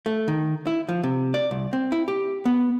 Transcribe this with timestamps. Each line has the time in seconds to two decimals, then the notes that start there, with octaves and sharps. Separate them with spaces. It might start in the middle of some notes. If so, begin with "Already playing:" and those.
0.06 A3
0.28 D#3
0.67 E4
0.89 F3
1.03 C3
1.34 D5
1.51 C2
1.73 C4
1.92 E4
2.08 G4
2.45 B3